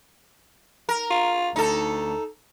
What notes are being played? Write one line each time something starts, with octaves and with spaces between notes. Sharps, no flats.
A#4
F4
D2 D#4 A4